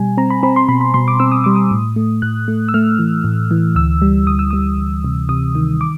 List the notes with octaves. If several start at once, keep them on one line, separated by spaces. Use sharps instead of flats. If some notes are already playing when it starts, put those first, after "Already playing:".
Already playing: B2 G3 G#5
C4 A#5
B5
C4 B5
C6
B2 B5
B5
B2 C6
D6
C4 E6
D#6
G3 D6
D#6
A2
A3
A2 F#6
A3
E6
A3 F6
E3
A2
E3
D2 E6
G3
D2 D#6
E6
G3 D#6
D2
C3
C3 D#6
D#3
D6